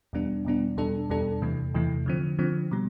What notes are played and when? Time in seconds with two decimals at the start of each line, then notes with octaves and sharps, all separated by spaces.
0.13 E2 B2 G3 B3 D4
0.45 E2 B2 G3 B3 D4
0.77 E2 B2 G3 D4 A4
1.10 E2 B2 G3 D4 A4
1.42 E2 C3 E3 A3
1.74 E2 C3 E3 A3
2.06 D3 F3 C4
2.39 D3 F3 C4
2.71 B2 G3